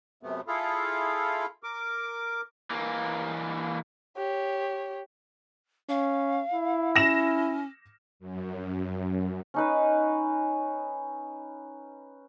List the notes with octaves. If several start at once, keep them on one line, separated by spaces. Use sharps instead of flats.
F#2 C3 A3 B3
E4 F4 G#4 A4 F5
A#4 D6
E3 A#3
G4 C#5
C#4 F5
E4
C#4 A#6 E7
F#2
C#4 D#4 B4